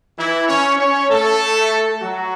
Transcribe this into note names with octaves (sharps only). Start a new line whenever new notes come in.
E3 E4
C#4 C#5
C#4 C#5
A3 A4
F#3 F#4